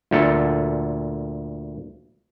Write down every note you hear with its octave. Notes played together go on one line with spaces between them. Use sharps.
D2 A#2 A4